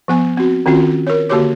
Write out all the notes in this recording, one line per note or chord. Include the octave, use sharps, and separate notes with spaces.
F3 B3 G#5
C4 F#4
D#3 C4 C#4 F4 F#4
A#4 C#5
D3 A#3 F#4 G4 C#5 D6